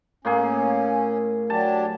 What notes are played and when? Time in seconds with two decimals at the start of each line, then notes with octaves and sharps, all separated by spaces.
0.25 A2 A#3 C#4 G#4
1.50 F#3 D4 G4 A5